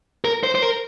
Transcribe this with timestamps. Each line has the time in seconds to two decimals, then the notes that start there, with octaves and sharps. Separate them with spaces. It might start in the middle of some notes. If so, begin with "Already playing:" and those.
0.25 A#4
0.43 C5
0.55 C5
0.62 A#4